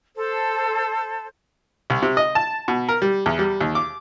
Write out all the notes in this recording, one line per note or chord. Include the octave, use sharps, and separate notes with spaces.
A4 C5
C2
C3
D#5
A5
B2
A#4
G3
E2
G3
D#2
D6